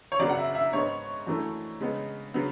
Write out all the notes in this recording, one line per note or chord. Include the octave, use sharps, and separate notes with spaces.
C#5
F#2 C#3 F#3 B3 D5
F#5
E5
E5
G#2 G#3 B3 C#5
F#2 E3 A3
C#3 G#3 B3
C#3 F#3 B3